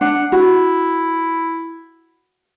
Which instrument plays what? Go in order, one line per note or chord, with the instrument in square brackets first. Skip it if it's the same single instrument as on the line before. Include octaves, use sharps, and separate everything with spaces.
[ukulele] D4 [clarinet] F#5
[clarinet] E4 [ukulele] F#4